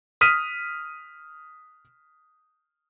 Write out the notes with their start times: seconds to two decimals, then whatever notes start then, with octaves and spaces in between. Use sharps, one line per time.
0.21 D#6 F6 B6 D#7